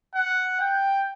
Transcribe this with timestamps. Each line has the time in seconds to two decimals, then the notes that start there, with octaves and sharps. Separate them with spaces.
0.15 F#5
0.60 G5